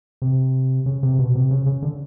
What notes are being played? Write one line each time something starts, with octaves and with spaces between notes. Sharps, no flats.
C3
C#3
C3
B2
C3
C#3
C#3
D3